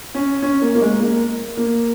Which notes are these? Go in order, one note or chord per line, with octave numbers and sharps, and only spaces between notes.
C#4
C#4
A#3
A#3
G#3
A#3
A#3